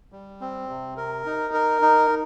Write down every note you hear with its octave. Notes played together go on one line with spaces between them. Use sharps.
G3
C4
C3
A#4
D#4
A#4
D#4